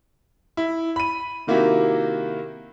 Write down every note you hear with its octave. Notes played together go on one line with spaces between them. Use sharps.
E4
B5 D#7
C3 D#3 A#3 E4 F#4 G4